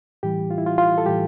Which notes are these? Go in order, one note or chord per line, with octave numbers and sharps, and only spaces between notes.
A2 E3 G3 G4
F4
E4
F4
F4
A4
A2 E3 G3 G4